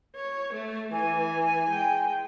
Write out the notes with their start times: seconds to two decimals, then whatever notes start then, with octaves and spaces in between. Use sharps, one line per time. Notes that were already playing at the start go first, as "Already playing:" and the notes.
0.16 C#5
0.53 A3
0.92 E3 G#5
1.69 G#3 G5